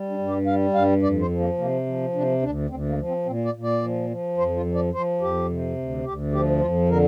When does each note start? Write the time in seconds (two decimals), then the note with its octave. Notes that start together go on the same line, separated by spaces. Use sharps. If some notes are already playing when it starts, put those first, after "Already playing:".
Already playing: G3
0.10 D4
0.19 G2
0.28 G4
0.46 G3 F5
0.74 G2 F5
1.03 F2 D5
1.21 C5
1.30 F3
1.40 A#3
1.58 C3 A#3
1.86 F3
2.15 C3 D4
2.42 D2 D4
2.70 D2 C4
2.89 A#3
2.98 F3
3.08 C4
3.26 A#2 C4
3.45 D5
3.54 A#2
3.63 D5
3.82 F3
4.10 F3
4.37 F2 C5
4.56 F4
4.66 F3
4.74 D5
4.93 F3 C5
5.21 F2 G4
5.49 C3
5.77 D2
6.05 D2 G4
6.33 F3 G4
6.61 F2 F4
6.89 D3 A#4